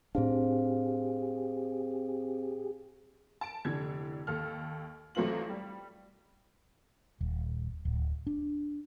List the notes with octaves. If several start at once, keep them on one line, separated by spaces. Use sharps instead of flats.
A2 C4 D4 G4 G#4 C5 F5
A5 D7
F1 D3 E3 G#6
D#2 A4 F6
A1 F#3 A3 C4 F4 F#7
G3
D#1
D1
D4